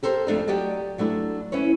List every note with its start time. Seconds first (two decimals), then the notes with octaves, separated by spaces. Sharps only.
0.03 G4 A4 A#4 C5
0.27 F2 A3 D4 D#4
0.47 F#3 G4 D5 D#5 A5
0.98 F#3 A3 D4 E4
1.52 C#4 E4 B4 C#5